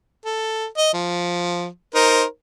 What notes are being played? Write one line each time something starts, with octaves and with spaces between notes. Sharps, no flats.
A4
D#5
F3
D#4 A#4 C5